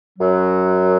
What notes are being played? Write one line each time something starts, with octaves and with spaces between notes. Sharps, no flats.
F#2 F#3